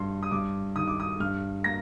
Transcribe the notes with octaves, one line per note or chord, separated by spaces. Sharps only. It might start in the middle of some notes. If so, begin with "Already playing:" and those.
Already playing: G2 C6
D#6
G2 D6
D#3 D#6
D6
D#6
G2 F6
A#3 A#6